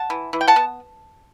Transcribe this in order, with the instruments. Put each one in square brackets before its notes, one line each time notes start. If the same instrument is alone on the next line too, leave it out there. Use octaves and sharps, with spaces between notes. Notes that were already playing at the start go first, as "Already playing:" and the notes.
Already playing: [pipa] F#5 A5
E3
E3
G5
F#5 A5
B3